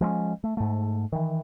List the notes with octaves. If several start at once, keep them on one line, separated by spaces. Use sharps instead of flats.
F3 G#3 A3 C#4
A3
G#2 A3
D#3 E3